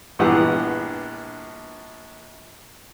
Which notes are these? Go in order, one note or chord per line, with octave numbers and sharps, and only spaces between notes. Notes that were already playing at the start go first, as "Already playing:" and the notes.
A#1 G2 E3 B3 G4 F#5